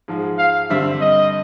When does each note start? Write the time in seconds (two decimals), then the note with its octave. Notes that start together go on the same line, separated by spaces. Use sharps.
0.08 G#2 F3 G#3
0.38 F5
0.70 G2 D3 G3 C4 E5
1.01 D#5